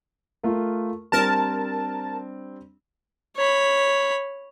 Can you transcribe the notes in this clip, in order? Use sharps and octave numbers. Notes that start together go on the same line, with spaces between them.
A3 F4 A#4
G3 C4 D4 A#4 A5
C#5 B5